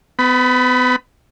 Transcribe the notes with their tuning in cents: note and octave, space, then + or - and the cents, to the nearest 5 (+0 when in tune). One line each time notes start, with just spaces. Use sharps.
B3 +35 B5 +0